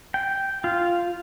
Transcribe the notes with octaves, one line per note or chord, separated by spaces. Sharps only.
G5
F4